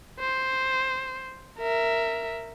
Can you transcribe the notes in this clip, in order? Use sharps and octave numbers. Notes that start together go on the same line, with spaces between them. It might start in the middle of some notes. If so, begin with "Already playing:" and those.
C5
A#4 E5